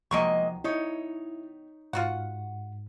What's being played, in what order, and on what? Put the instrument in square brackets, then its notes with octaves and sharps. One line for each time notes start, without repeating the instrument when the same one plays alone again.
[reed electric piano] C2 F3 [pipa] B2 D#3 C#6 [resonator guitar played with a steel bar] G#3 A#3 D#5
[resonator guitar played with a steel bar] D#4 C#5 [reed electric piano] E4
[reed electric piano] G#2 [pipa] F4 F#4 F#5